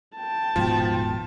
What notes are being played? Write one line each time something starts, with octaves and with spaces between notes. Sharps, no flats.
G5 A5
D#1 G#2 B2 F3